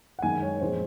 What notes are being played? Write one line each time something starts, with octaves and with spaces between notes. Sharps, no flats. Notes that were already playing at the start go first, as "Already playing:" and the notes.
F#5
F#2 D#3 G#3 C#4 G#5
C#5
A#2 F3 G#3 C#4 C5